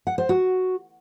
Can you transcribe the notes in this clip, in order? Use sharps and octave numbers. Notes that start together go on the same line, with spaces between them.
F#5
C5
F#4